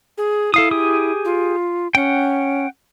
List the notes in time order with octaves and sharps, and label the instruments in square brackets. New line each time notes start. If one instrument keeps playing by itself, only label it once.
[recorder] G#4
[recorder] E4 [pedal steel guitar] A4 F5 D#6
[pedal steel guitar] G4 G#4 D#6
[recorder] F4
[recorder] C#4 [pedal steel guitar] F#5 G5